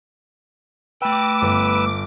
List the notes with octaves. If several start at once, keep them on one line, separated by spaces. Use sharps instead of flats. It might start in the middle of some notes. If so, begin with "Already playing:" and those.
A3 B4 G5 D6 E6
G1 B3